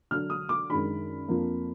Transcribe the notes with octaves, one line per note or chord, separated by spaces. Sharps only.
D3 F#3 D4 F6
D#6
D6
F#2 D#3 G#3 D4 B5
F2 F3 A#3 D4